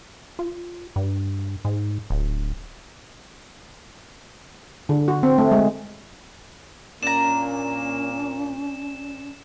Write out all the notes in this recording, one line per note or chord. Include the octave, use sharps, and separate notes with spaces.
F4
G2
G#2
D1
D3
F#4
C4
A3
G#3
A#2 A#3 C#4 D4 A#5 E7